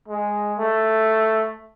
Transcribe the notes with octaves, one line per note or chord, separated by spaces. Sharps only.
G#3
A3